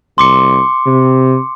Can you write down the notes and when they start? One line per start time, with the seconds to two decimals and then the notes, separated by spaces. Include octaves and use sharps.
0.18 C2 C6 D6 C#7
0.86 C3